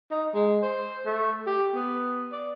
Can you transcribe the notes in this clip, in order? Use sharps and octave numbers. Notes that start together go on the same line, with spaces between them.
D#4
G#3
C5
A3
G4
B3
D5